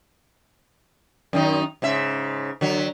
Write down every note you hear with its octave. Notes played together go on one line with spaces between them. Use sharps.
F#2 D#3 D#4
G#2 C#3 E5
D3 F#3